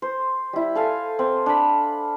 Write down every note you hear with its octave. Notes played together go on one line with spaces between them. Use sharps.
C5
G3 E4
A4 F5 G#5
C4
D4 B5